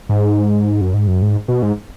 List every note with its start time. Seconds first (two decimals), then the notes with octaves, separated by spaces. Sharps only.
0.09 G#2
0.81 F#2
0.94 G#2
1.07 F#2
1.22 G#2
1.48 B2
1.62 G#2